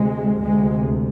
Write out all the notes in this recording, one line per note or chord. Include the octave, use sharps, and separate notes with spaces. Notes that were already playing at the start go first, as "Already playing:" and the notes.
Already playing: D2 C3 G#3
D2 G#3
C3